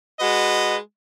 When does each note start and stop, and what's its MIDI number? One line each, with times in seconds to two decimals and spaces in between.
0.20 0.77 56
0.20 0.77 66
0.20 0.77 71
0.20 0.77 75